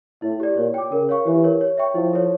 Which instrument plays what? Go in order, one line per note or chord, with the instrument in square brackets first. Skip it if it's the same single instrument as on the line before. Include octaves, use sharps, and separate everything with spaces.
[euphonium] A2 [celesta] E4
[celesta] G4 D5
[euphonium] A#2 [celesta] C#5
[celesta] G5 D6
[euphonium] C#3 [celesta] A#4
[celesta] C#5 F5 C#6
[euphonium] E3 [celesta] G4
[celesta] A#4 C#5
C#5
E5 G5 C#6
[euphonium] F3 [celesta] E4
[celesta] A4 C#5